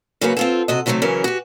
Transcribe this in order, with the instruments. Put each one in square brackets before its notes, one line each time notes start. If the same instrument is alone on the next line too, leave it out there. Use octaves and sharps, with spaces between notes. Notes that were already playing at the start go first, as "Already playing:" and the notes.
[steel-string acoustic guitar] C#3 F#3 A#3 F#4 B4
C4 F4 A4
C3 F#4 D#5
C3 D#3 F#3 G3 A3 C4
C#3 E3 F#3 C#4 A#4
F#4 G4